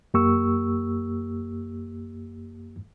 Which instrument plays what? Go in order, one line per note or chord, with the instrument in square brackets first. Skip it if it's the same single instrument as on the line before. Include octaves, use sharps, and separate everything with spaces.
[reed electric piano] F#2 A#3 G4 C#6 E6